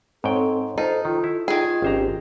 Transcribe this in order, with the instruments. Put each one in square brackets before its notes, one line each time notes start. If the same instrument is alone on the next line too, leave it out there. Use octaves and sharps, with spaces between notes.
[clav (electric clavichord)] G#2 G5 [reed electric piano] C4 C#5 [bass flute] A4
[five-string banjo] D#4 [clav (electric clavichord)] F4 [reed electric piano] A4 [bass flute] C5
[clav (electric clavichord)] D#3 [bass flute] F4
[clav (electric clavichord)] E4
[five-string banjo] D#3 G#4 [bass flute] F4
[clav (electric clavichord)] G#1 C5 A#5 [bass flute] C#4 [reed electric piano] F4 G4